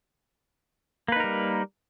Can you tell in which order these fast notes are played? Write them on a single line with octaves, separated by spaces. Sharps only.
A#3 B4 D#4 A#4 G3